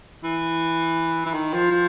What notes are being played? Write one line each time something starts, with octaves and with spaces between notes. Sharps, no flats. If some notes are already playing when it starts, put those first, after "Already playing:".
E3
E3
D#3
F3
F3